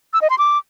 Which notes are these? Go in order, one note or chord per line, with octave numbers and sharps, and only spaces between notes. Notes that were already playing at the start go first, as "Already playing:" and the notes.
E6
D#5
C6
D6